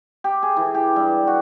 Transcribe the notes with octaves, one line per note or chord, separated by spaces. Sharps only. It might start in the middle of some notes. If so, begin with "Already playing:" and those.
G4
G#4
E3
G4
G2
F#4